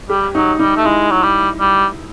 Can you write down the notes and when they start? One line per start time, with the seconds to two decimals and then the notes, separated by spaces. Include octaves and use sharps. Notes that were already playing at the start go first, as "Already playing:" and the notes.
0.09 G3 G4
0.35 F#3 D#4
0.59 G3 D#4
0.77 A3
0.85 G#3 E4
1.11 F#3
1.23 G3
1.60 G3